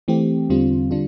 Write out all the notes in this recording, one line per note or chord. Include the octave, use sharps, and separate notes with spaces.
E3 A3 C4 G4
E2 D3 G3 C4 F4
D3 G3 D4 F4